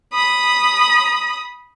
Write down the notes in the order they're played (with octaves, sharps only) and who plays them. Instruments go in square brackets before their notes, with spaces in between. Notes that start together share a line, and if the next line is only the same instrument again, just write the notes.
[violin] B5 D#6